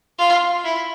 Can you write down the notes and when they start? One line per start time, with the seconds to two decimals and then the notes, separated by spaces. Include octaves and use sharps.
0.18 F4
0.64 E4